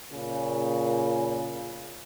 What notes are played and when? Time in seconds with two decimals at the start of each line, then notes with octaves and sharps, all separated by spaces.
0.11 A#2 C#3